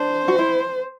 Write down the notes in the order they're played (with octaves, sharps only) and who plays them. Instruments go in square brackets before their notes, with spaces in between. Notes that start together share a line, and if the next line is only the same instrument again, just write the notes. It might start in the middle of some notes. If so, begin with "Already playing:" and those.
Already playing: [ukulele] D4 [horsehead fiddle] C5
[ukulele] F#4
E4